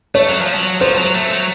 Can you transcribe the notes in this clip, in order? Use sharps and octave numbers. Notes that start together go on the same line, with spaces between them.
A3 C#5
F#3
F3
F#3
F3 C5
F#3
A3
F#3